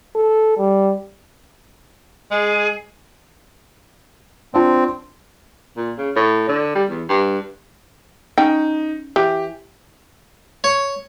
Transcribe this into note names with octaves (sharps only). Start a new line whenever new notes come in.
A4
G3
G#3 G#4
C4 D4 F4 A5
A#2
C#3
A2
D3
G3
E2
G2
C#4 D#4 G5
E3 G4
C#5